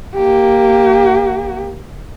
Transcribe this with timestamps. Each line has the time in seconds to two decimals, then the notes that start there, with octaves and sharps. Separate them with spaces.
0.16 A#3 G4